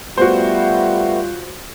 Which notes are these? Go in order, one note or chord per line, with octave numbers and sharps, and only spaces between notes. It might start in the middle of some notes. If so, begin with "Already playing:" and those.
G3 A3 B3 F4 F#4 C5